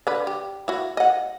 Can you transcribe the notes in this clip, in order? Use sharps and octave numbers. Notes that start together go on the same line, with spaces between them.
D3 B4
G4
E4 F#4
D#5 F#5